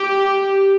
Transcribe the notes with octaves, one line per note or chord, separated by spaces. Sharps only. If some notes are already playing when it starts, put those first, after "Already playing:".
Already playing: G4